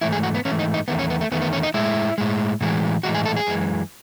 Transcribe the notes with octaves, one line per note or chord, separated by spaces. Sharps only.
G#2 E3 A3 E4
G#4
F#4
B3
G#2 E3 A3 C#4
D#4
D#4
E2 D#3 A3 B3
C#4
B3
A3
E2 D#3 A3 B3
B3
C#4
D#4
A2 G#3 E4
A2 G#3
A2 E3 G#3
A2 E3 G#3 F#4
G#4
A4
G#4
F#2 E3 G#3